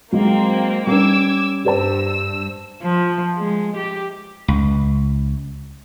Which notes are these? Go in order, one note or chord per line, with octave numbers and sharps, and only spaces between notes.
F#3 G#3 A#3 C4
G3 C#4 D6 E6 G#6
G2 G4 C5 A5 E6
F3
G#3
G4
C#2